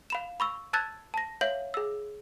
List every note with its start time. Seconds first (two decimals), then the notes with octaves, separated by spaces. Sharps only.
0.10 F5 B5 E7
0.40 B5 C#6 E6
0.73 A5 E6 F#6 G#6 A6
1.14 A5 A#6
1.41 C#5 E5 F5 G6 F#7
1.74 G#4 E6